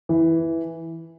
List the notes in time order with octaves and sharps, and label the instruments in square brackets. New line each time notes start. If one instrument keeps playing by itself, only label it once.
[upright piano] E3